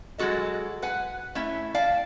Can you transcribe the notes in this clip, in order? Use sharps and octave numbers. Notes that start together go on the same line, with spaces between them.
F#3 G#3 A#3 F#4 A4 D#5
B4 F#5 G#5
A3 C#4 E4 E5
D5 F5 G5 A5